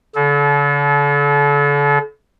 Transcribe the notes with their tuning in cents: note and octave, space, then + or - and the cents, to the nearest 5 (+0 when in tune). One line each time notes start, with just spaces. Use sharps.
D3 -40 A4 -35